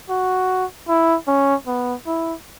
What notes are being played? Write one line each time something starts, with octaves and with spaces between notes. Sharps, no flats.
F#4
E4
C#4
B3
E4